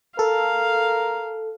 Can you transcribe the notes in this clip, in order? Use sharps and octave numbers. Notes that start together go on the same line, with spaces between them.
A4 A#4 F5